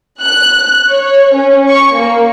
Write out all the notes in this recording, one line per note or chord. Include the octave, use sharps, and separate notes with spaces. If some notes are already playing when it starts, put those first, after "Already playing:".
F#6
C#5
C#4
C#6
A#3